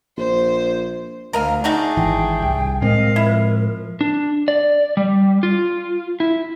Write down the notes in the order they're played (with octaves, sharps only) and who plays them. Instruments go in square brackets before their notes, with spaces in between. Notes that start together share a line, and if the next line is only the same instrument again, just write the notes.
[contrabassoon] A#1 [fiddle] C5
[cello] D2 [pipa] A#4 D#5 F5
[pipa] A3 D#4 F#4 [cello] D4 G#4
[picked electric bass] G#1 E3 [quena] G5
[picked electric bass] C2
[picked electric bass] A2 G#3 C4 [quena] A#4 [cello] D#5 F5
[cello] F3 [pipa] E4
[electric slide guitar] D4
D5
G3
F4
E4